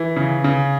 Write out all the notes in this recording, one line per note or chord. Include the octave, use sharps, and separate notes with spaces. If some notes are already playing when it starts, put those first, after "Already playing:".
Already playing: E3
C#3
C#3